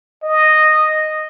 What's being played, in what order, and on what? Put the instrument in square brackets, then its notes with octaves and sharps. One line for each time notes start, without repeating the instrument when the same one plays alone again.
[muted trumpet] D#5